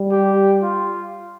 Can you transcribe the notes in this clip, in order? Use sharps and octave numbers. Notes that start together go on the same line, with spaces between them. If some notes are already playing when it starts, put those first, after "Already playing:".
Already playing: G3
G4
F4